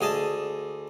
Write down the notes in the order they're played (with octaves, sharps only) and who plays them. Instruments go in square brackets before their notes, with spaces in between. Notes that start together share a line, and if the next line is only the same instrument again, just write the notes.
[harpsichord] D2 G#4 D#5 A5